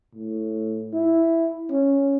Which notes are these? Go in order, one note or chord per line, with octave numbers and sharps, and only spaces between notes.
A2
E4
C#4